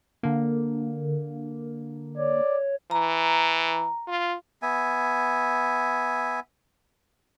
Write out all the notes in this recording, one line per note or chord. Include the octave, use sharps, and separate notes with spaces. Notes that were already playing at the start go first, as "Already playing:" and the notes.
D3 A#3
C#5 D5
E3 A#5
F4
B3 E5 G#5